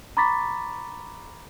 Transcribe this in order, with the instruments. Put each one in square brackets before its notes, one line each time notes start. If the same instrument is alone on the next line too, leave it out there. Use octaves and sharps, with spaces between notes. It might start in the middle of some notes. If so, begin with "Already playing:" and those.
[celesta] A#5 B5 C#6 D6 A6 B6